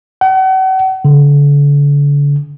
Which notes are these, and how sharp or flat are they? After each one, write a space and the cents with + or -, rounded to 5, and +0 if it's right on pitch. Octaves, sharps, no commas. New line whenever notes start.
F#5 +40
D3 -40